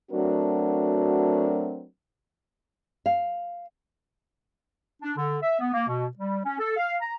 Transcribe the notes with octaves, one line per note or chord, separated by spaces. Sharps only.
F#3 A3 C4 D4 F#4 A#4
F5
D4
D3
E5
B3
A#3
B2
G3
C#4
A4
F5
A#5